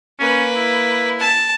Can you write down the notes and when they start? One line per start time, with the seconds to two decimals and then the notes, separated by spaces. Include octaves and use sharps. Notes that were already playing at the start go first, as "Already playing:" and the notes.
0.19 A#3 C#4 B4
0.56 E4
1.19 A5